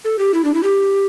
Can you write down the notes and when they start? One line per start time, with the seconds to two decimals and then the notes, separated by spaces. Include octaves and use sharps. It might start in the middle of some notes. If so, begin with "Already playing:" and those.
0.05 A4
0.19 G4
0.34 E4
0.44 D4
0.54 E4
0.63 G4